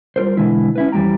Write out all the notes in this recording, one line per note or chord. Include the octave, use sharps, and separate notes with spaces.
G3 F4 A#4 C5
B2 D3 E3 G#3 E4
C#4 E4 B4
F2 E3 G3 G#3 G5 A#5